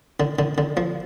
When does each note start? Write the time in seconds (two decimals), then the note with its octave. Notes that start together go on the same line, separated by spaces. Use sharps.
0.20 D3
0.39 D3
0.58 D3
0.77 F3